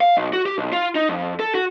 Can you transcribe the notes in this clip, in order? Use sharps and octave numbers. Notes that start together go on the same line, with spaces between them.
F5
B1
F#4
G4
B1
F4
D#4
F2
A4
F#4